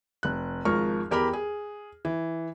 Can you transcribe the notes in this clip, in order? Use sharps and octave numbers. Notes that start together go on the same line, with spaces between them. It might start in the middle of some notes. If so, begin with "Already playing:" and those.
F1 F#6
G#1 G#2 F3 A#4 C#6 F6
E2 G4 A#4 G5 B5
G#4
E3